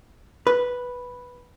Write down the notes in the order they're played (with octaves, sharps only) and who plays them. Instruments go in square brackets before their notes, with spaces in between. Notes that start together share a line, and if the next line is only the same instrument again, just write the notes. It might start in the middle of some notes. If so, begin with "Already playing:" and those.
[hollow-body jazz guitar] B4